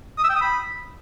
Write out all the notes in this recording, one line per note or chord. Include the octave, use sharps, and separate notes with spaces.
D#6
E6
G5
D#6
B5